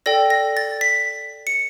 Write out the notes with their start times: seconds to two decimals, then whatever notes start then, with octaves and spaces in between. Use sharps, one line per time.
0.06 A4 D5 G5 A#6
0.30 A#6
0.57 A6
0.81 B6
1.47 C#7